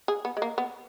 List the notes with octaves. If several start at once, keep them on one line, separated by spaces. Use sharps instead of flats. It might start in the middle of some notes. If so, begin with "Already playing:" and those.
G#4
B3
G#3
A#3
B3